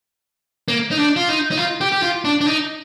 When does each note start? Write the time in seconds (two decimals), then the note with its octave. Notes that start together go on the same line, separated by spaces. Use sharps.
0.68 A#3
0.91 D#4
0.98 D4
1.16 F4
1.29 D#4
1.51 D#4
1.57 F4
1.81 G4
1.92 G4
2.03 F4
2.25 D4
2.41 D4
2.47 D#4